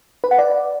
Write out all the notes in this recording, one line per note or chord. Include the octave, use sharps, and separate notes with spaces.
B4
F#5
D5